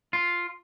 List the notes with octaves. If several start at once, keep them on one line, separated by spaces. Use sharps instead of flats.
F4